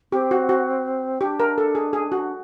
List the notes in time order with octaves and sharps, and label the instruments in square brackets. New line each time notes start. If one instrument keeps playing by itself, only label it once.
[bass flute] C4 [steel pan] G4
[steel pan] F#4
F#4
[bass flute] D4 [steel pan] G4
[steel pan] A#4
A4
G#4
G#4
F#4